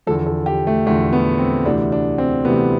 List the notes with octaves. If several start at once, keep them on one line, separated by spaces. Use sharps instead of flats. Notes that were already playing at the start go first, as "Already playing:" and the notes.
E2 D3 F3 A4
A4
G4
A3
E2 D3 F3 A3
B3
C4
D2 C3 E3 D4
D4
C4
D2 C3 E3 B3